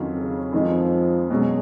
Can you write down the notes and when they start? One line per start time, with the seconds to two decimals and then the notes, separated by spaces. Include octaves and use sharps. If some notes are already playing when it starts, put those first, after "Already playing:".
Already playing: F2 D#3 F#3 C#4 F4
0.15 C#3
0.53 F2 D#3 F3 G#3 D#4
1.30 B2 F#3 G#3 C#4